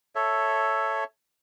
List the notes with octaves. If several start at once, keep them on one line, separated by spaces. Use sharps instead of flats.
A4 C#5 E5